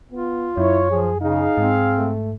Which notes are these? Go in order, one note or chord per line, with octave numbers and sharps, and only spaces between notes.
B3 F4
F#2 E4 C#5
F3 G#4
C#3 D#4 G#4 F5
G#2 C4
A3